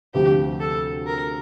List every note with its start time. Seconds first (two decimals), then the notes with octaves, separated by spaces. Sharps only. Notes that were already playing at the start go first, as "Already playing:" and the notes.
0.14 D2 C3 F3 G4
0.60 A4
1.07 A#4